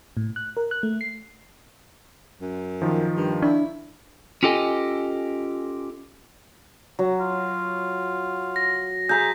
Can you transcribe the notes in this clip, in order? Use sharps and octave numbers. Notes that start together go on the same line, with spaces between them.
A2
F#6
A#4
F#6
A3
C7
F#2
D#3 F3
G2
D4 E4
C#4 F4 G4 A4 D#5 G#5
F#3
F4
A#6
G#4 E5 A#5 C6 G6 B6